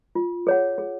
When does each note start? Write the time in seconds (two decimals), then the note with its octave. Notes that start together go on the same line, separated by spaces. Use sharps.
0.15 F4
0.47 G#4 C#5 F#5
0.78 G#4